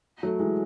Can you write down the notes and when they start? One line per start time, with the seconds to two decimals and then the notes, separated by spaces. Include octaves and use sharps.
0.23 F#3 A3
0.39 E3 G#3